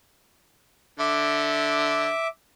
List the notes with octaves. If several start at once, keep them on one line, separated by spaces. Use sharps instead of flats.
D3 E5 D6